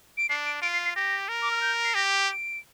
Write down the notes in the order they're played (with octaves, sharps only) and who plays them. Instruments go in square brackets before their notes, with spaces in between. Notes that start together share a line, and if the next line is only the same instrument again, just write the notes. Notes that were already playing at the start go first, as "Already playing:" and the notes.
[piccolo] D7
[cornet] D4 [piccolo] C7
[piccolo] D7
[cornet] F4 [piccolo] D7
[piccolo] C7
C7
[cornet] G4 [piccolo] A#6
[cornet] A#4
[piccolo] D6
F6
G6
C7
[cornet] G4 [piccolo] A#6
[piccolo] D7